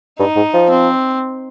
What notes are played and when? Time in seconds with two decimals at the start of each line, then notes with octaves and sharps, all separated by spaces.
0.19 G2 D#4
0.36 G#2
0.53 F3
0.70 C4